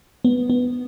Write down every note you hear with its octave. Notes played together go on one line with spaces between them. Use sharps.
B3
B3